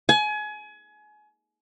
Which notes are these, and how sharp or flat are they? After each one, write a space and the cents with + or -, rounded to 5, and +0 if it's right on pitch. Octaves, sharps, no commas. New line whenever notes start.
G#5 +30